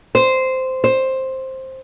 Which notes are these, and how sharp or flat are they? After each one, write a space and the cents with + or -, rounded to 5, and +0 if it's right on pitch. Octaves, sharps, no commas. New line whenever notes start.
C5 -10
C5 +10